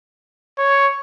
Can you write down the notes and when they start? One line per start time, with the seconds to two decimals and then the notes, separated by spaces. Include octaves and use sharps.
0.58 C#5